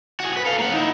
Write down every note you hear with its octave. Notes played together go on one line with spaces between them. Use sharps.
F#4 G#4
G#4 B4
A4 F5
A#3 F#5
D#4 E4